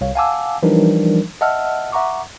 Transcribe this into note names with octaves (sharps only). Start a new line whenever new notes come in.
C2 C#5 F5
F5 F#5 G#5 A5 D6 E6
E3 F3 G3 D4 D#4 A#4
D#5 E5 F#5 A5 E6 F6
E5 F#5 A#5 C#6 D6